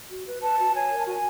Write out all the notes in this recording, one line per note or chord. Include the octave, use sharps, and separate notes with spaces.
F#4
B4
B4 A5
F#4
C#5 G#5
A#4
A5
F#4 G#5